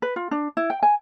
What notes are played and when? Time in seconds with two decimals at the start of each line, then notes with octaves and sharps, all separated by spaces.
0.02 B4
0.16 F4
0.31 D4
0.57 E4
0.70 G5
0.83 G#5